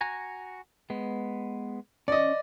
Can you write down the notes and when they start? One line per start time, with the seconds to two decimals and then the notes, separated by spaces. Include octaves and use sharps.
0.01 F#4 G#5 A#5
0.90 G#3 B3
2.08 C#4 D5 D#5